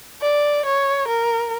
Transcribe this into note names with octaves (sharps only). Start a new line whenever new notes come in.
D5
C#5
A#4